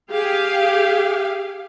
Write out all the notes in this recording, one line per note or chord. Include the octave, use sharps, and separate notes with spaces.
G4 G#4 F5